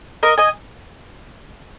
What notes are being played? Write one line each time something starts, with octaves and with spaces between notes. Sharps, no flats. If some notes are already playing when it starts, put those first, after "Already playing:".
A#4 D#5
D#5 G#5